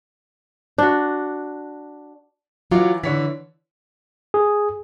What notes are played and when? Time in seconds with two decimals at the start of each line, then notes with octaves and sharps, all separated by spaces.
0.78 D4 F#4
2.71 E3 F#3 F4 D6
3.04 D3 E3 C#5 B6
4.34 G#4